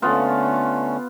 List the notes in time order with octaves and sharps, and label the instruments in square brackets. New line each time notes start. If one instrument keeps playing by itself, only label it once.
[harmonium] D3 A3 C#4 [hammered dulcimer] B3 F4